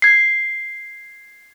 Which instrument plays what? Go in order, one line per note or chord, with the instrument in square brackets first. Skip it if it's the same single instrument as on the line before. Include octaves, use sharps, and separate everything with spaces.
[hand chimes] G#6 C7